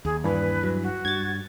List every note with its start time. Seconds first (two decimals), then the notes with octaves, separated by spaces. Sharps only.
0.05 D#2 G#4
0.24 G2 E3 B4
0.63 F#3
0.83 F#4
1.05 G2 G#6 A6